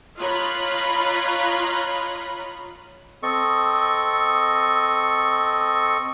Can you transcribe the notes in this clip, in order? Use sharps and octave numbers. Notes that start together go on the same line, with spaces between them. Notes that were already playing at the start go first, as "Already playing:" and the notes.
F4 C#5 D#5 A#5 B5 F#6
C4 A4 D#5 C#6